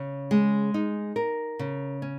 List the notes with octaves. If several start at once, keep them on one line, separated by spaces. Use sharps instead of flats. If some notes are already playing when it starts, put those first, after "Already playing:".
Already playing: C#3
G#3
D#4
A#4
C#3
C#4